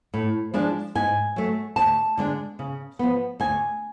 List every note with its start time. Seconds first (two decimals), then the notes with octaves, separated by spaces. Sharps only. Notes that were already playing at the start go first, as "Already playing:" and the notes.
0.14 A2
0.54 F3 G#3 D4
0.95 G#2 G#5
1.36 F#3 A3
1.76 D2 A5
2.17 D3 G#3 D4
2.59 C#3
2.99 F3 B3
3.40 D2 G#5